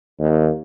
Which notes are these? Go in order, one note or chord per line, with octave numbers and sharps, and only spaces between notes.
D#2